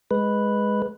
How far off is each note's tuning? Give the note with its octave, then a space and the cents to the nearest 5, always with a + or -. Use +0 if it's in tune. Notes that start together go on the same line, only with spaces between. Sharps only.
G#3 +0 B4 +0